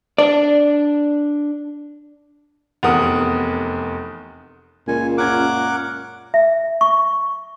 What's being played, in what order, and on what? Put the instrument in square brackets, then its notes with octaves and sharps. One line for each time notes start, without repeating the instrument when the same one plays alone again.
[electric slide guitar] D4 [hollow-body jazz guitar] D5
[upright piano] F1 E2 A#4 F#5 D#6
[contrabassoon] C#2 [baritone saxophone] A#2 [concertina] G#5
[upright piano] F#2 C#4 G#6 [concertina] A#4 F#5 D6
[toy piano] E5
C#6